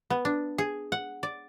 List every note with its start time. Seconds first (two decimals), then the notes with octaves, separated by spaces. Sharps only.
0.10 B3
0.25 D4
0.58 G#4
0.92 F#5
1.23 D5